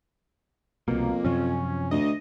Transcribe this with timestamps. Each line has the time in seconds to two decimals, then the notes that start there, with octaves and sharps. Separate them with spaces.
0.88 C2 F2 B2 A#3
1.24 F#2 C3 F3 C#4
1.91 D2 D#5